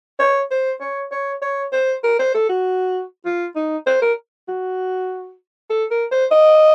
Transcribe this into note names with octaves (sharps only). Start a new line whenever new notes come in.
C#5
C5
C#5
C#5
C#5
C5
A#4
C5
A4
F#4
F4
D#4
C5
A#4
F#4
A4
A#4
C5
D#5